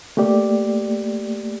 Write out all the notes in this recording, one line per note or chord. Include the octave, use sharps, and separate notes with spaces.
A3 A#3 G4 D5